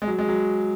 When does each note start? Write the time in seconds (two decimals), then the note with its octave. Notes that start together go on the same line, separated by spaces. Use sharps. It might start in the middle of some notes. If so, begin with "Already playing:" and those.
0.02 G#3
0.08 F#3
0.19 G#3
0.28 F#3